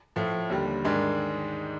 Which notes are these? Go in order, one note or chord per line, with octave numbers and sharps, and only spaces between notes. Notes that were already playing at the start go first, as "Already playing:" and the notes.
A2 F3 A3
D#2 D3 G3
G#2 D#3 G#3 D4